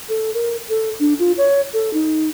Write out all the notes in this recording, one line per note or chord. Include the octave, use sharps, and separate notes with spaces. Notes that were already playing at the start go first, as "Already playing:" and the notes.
A4
A#4
A4
D4
F4
C#5
A4
D#4